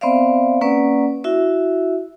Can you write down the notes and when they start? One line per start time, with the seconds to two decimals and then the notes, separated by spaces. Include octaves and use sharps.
0.01 B3 C4 C5 D5 E5 F5
0.61 A#3 C#4 B4 D5 F#5
1.24 E4 F#4 E5